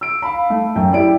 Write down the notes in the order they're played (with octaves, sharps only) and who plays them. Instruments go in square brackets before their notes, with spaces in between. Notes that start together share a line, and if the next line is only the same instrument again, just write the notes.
[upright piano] E6 D7
[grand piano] F5 B5
A3
[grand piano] F#2 [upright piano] G5
[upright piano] E4 G4 [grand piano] D5 D7